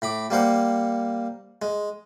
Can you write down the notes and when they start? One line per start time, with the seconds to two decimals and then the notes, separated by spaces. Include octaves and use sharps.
0.02 A2 B5 D6
0.30 G3 A#3 C5 F#5
1.62 G#3